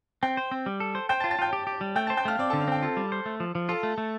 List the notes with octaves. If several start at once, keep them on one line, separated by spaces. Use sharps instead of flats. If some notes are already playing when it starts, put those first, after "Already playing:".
C4 G5 G6
C5
C4
G3
A4
C5
C5 G5 G6
A5 A6
F4
A5 A6
F4 G5 G6
G4
G4
G3
A3 G5 G6
C5 A5 A6
G5 G6
A3 F5 F6
C4 D5 D6
D3 A4 A5
F5
C4 G5
F4 A4 A5
G3
C5
A3
F3
F3
F4 A4 A5
A3
A3